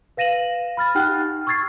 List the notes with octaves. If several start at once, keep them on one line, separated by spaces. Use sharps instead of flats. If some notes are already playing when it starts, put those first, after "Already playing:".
B4 F5 A#6 D#7 E7 F#7
B5 F6 A6
D#4 G4 F#5 G5 F6 F#6
C#6 E6 G#6 A6 C7